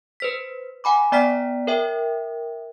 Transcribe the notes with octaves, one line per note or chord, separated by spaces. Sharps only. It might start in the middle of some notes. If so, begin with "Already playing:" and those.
B4 C5 B6
F#5 G#5 B5 D6
B3 D5 G5 A#5 F6 B6
A#4 C#5 E5 G5